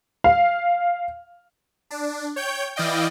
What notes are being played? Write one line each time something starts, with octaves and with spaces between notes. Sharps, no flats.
F5
D4
C#5 G5 G6
E3 E4 D5 D#5 F5 G5